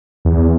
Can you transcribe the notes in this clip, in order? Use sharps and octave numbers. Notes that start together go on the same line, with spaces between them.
E2